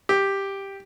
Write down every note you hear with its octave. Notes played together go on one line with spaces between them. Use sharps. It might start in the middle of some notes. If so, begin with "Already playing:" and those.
G4